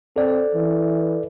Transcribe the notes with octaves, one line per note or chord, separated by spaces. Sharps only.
C4 A4 D5
E3